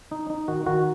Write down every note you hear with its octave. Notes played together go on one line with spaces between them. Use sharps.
D#4
D#4
D#3 F#4
D#3 F#4